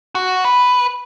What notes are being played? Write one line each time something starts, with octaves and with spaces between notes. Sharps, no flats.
F#4
B4